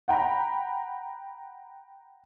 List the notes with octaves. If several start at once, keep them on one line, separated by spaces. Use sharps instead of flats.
F#5 G5 A#5 B5